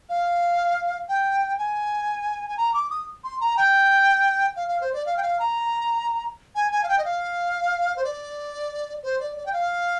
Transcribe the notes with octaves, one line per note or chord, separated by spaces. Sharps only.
F5
G5
G#5
G#5
A#5
D6
D#6
C6
A#5
G5
F5
F5
C5
D5
F5
G5
F5
A#5
G#5
G#5
F5
G5
D#5
F5
C5
D5
C5
D5
D5
G5
F5